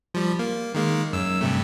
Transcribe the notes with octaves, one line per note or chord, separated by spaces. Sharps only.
F3 G3
A#3
D#3 G#3 A#3
F#2 E6
G2 C3 A3